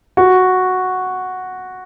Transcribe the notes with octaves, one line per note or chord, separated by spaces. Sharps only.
F#4